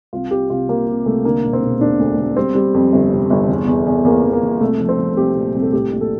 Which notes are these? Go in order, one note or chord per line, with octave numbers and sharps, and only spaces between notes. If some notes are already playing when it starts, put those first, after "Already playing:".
C2 F4
C3 G4
C2 F4
C3 A#3
C3
C2 A3
D3 A#3
E1
C4
E1
E1 D4
D2
D2
G3 C4
G3
F2
G1
C3
G1
E2
E2
E2
E2 A#3
E2
A#3
E2
C2 A3
F3
C4
F3
C2 G4
A#2
C2
A4
A2 G4
A#1
A4